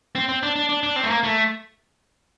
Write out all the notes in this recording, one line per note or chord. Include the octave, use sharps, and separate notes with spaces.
C4
C4
D4
D4
D4
D4
C4
A3
A#3
A3